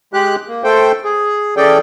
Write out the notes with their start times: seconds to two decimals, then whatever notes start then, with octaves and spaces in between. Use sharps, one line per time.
0.14 G#3 G4 F#6
0.48 A#3
0.64 A3 A4 C5 G5
1.04 G#4
1.57 E3 C#4 G#4 A4 D5 G5